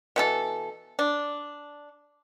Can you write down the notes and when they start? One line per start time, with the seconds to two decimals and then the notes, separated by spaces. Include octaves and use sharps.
0.16 B2 E3 A4
0.99 D4